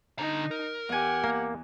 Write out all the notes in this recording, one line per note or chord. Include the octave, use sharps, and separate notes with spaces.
D3 D#4 A#5
A#4
E2 G4 F#5 G#5
A#3